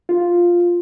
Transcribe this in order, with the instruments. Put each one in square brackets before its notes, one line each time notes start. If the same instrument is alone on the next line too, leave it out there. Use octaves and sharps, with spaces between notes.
[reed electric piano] F4